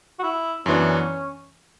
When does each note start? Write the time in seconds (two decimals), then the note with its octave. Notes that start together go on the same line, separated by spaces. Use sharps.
0.19 F#4
0.23 E4
0.66 F#2 E3 B3 C#4 D4